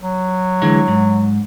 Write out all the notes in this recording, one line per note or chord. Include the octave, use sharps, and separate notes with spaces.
F#3
D3 E3 G#3
G#2